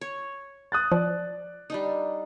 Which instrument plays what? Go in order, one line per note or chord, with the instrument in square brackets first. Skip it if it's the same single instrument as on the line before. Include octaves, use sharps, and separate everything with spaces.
[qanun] C#5
[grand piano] D#6 F#6 A6
[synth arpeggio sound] F3 [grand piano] D5
[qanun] G3 D4 D#4